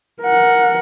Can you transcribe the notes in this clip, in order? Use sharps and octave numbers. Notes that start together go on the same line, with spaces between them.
A#4 F#5